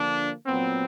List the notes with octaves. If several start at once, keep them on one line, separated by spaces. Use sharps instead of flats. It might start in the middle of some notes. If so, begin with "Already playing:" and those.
Already playing: D3 F3 A#3 D4
A#2 F#3 B3 C4